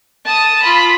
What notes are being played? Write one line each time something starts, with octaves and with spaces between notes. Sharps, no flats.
A5 D#6
F4 B5